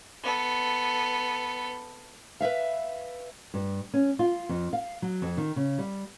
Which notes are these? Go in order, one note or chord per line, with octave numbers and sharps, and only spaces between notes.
B3 A4
B4 C5 E5 F5
G2
C#4
F4
F2
F5
F#3
F2
D#3
C#3
G3